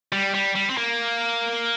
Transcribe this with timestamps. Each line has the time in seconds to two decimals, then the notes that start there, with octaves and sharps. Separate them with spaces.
0.12 G3
0.34 G3
0.55 G3
0.70 C4
0.77 A#3